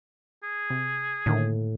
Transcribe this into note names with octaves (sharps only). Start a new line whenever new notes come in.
G#4
C3
A2 D3 D#3 A#3